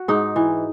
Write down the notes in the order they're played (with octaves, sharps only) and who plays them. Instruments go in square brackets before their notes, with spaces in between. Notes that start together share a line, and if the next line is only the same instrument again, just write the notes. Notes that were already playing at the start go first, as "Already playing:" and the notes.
Already playing: [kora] F#4
G#2 D#4
E3